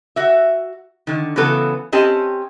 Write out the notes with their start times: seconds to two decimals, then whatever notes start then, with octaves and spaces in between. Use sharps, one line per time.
0.16 F#4 E5
1.07 D3 D#3
1.36 C#3 E3 F#3 B3 A4 B4
1.92 C4 C#4 G4 D#5 A5